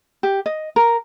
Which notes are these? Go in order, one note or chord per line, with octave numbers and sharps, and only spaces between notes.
G4
D#5
A#4